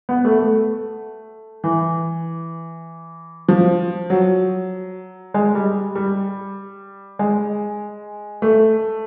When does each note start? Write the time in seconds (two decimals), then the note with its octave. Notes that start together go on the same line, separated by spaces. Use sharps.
0.09 B3
0.25 A3
0.39 A3
1.64 E3
3.48 F3
4.10 F#3
5.34 G#3
5.55 G3
5.95 G3
7.19 G#3
8.42 A3